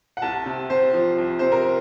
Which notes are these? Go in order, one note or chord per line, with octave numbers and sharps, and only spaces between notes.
F#5
C2 A5
C3
C3 C5
F3
C2
C3 C5
A#4